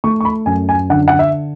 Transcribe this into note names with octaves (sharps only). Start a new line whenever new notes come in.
A3 C#6
C#6
B5
F#2 G#5
G#5
D3 F#5
F#5
E5